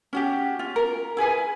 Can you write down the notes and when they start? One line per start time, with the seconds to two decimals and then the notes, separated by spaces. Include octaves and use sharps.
0.13 C#4 F#4 G4
0.59 F4
0.76 A#4
1.17 E4 G#4 B4 G#5